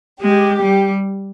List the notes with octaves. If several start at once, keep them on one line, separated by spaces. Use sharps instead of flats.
G#3 G4
G3